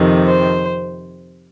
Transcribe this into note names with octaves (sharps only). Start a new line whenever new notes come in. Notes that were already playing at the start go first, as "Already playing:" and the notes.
Already playing: F2 C3 D#3
C5